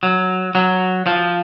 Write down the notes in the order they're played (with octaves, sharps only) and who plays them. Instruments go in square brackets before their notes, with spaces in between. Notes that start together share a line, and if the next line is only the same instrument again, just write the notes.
[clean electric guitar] F#3
F#3
F3